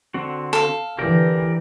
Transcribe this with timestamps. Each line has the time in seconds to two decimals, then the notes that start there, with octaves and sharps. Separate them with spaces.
0.14 D3 C4 F#4
0.53 A4 F5
0.99 D3 E3 G4 A#4 D5